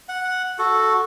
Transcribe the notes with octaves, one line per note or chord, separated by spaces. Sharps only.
F#5
F#4 A4